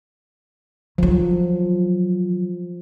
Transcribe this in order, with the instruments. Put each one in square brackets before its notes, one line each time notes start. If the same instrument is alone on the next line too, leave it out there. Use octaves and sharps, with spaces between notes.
[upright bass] D#3 F#3 [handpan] F3